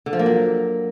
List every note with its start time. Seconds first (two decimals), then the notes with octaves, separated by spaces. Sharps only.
0.06 D3
0.13 F3
0.19 A#3
0.26 F#3